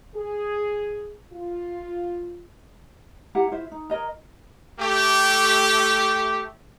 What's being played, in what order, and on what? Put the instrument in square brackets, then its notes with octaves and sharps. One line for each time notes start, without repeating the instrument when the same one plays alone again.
[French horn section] G#4
F4
[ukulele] E4 G4 F#5 A#5
E4 F4 C5 E5
D#4
A#4 C#5 D#5 A#5
[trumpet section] A3 G4